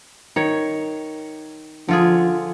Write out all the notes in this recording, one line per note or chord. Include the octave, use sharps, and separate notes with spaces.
D#3 C#5
D3 F3 F4 G#4